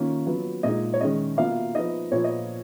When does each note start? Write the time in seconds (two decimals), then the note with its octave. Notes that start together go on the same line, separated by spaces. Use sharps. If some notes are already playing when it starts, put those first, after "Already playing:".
Already playing: D#3 A#3 C#4 F4
0.26 F#3 B3 F4
0.63 A#2 G#3 D#4 D#5
0.94 C#5
1.01 D#3 G#3 C#4 D#5
1.37 B2 A#3 F4 F5
1.75 F3 B3 D#4 D#5
2.12 A#2 F3 B3 C#5
2.24 D#5